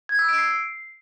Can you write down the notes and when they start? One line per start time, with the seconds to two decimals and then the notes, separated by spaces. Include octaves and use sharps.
0.09 G#6
0.19 E6
0.28 D7
0.38 C7